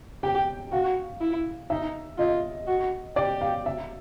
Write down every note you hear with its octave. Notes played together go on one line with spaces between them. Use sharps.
G4 G5
F#4 F5
E4
D#4 E5
F4 D#5
F#4
G4 D5
F5
E5